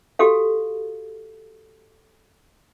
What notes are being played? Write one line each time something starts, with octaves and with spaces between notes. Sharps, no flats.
F#4 G4 A4 F5